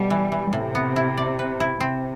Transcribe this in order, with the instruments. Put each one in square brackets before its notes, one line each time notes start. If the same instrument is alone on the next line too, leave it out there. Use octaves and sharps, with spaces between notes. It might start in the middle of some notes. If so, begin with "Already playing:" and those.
Already playing: [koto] B2 A3 [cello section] G3
[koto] E3
E3
[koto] A2 [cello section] C3
[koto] B3
E4
D5
B4
E4
[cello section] C3 [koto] C4